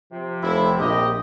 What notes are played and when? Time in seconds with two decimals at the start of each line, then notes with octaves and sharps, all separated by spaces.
0.12 C3 F3
0.43 F1 E4
0.78 A#1 G4 D#5